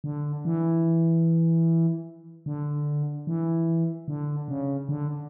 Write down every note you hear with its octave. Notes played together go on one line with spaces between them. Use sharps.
D3
E3
D3
E3
D3
C#3
D3